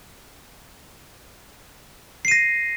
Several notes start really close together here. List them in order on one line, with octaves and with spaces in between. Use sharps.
C7 D#7 A#6